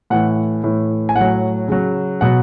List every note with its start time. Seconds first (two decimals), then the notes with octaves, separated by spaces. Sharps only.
0.10 A2 E3 F#5
0.64 A2 E3
1.09 G#5
1.15 A2 F#5
1.21 F#3
1.68 C#3 F#3
2.21 B2 F#3 F#5